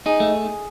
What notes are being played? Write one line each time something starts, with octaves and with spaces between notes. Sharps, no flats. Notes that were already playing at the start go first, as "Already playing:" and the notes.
D#4 G#4
A3